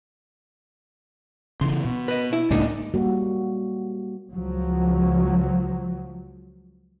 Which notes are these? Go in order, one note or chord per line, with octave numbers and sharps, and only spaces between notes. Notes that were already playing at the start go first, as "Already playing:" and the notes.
C#3 E3 C6
B2
B4 D#5
E4
C#2 A2 G#3 A#3 D4 D#4
G3 A#3 F#4
C#2 F3 F#3